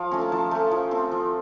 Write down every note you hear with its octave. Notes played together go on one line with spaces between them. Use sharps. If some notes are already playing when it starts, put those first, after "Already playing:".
Already playing: F3 F5
A3 C#4 A#5
A5
F3 A5
A3 C#4
F3
A3 C4
F3